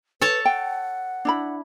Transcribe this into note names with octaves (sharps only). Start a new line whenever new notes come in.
A4 B4 C#5 A5
F#5 G5
D4 E4 B5